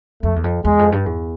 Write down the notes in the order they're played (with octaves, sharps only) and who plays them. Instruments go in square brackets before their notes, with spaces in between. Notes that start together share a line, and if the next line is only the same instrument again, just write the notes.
[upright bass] F2 [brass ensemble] A3
[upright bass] E2
F2
[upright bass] E2 [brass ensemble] G#3
[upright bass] F2
G2
E2